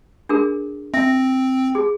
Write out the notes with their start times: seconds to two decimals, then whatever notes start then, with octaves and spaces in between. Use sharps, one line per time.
0.29 D4 G#4 A#4
0.94 C4 E5
1.75 G#4